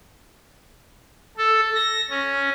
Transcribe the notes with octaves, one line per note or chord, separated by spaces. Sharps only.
A4
A#6
C#4